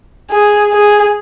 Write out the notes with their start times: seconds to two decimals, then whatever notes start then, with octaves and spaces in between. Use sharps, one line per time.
0.30 G#4
0.72 G#4